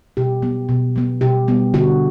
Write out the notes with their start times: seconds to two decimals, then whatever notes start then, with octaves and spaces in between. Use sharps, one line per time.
0.17 B2 G4
0.42 F#3 B3
0.69 B2
0.96 F#3 B3
1.21 B2 G4
1.48 G3 B3
1.74 D3 F#4